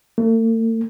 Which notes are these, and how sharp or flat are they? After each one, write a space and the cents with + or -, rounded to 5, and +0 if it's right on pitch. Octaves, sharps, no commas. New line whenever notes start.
A3 +45